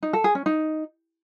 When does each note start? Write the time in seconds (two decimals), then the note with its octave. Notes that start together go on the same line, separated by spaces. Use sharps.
0.03 D#4
0.13 A4
0.24 G#4
0.35 C#4
0.46 D#4